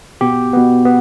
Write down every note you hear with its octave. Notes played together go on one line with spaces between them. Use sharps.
B2 B3 G4
B2 B3
B3